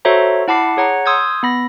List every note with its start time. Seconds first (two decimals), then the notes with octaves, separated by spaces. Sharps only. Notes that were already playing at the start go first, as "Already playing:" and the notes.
0.05 F#4 A4 C5 C#5 E5 A#5
0.48 E4 F#5 A5 B5 D6 C7
0.77 G#4 C#5 F#5 A#5
1.06 C6 D#6 E6 G6 G#6
1.43 B3 B5 A#6